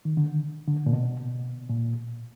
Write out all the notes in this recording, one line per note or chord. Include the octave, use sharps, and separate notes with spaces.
D#3
D3
D3
A#2
B2
A#2